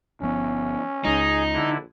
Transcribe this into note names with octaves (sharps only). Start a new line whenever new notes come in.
G1 F3 B3 C#4
C#2 G#3 D#4 G#4
A#1 D3 E4